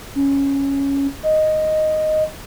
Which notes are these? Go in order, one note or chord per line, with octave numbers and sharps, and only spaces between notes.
C#4
D#5